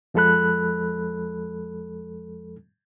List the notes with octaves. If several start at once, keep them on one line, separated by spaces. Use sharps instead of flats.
F2 F3 G#3 A4 B5 F#6